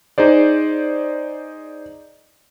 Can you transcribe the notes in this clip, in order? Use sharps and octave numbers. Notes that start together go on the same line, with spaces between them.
D#4 G#4 C5 D5